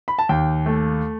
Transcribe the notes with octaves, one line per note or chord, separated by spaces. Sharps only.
B5
A5
D#2 G5
A3